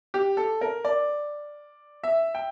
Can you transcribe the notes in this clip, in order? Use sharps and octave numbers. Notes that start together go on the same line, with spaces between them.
G4
A4
A#4
D5
E5
G5